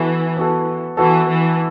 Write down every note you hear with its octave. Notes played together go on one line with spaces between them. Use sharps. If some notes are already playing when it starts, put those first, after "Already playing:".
Already playing: E3 B3 F#4 A4
B3 F#4 A4
E3 B3 F#4 A4
E3